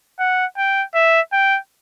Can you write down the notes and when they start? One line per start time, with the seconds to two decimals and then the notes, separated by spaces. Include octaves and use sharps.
0.19 F#5
0.58 G5
0.95 E5
1.32 G5